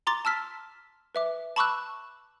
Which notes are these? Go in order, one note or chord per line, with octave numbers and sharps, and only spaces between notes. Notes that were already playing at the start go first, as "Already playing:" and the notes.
A#5 C6 D6 A6
A5 E6 F6 B6
B4 E5 D6
A5 B5 C#6 D6 E6 F#6